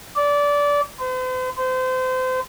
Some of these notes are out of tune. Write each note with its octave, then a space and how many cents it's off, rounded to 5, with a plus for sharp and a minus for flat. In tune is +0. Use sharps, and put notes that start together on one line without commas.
D5 -20
C5 -45
C5 -30